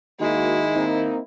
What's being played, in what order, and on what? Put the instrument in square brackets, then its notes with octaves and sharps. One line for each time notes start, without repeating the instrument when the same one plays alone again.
[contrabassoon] D#3 [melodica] G#3 [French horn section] A#3 F#4 [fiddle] E4
[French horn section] A#3 C4 D#4